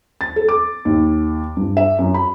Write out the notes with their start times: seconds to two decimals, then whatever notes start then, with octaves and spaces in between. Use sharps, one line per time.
0.21 A6
0.36 A4
0.48 D6
0.85 D#2
1.57 G2
1.77 E5
1.99 F#2
2.14 B5